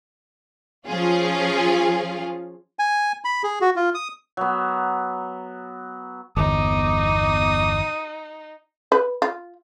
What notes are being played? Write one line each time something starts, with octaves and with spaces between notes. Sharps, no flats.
F3 C#4 F4 G#4 F5
G#5
B5
G#4
F#4
F4
D#6
F#3 B3
G1 E2 D#4 D6 D#6
B4
F4